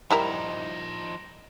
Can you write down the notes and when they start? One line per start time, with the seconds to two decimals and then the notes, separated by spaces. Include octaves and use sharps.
0.10 F3 G3 D#4 E4 A#4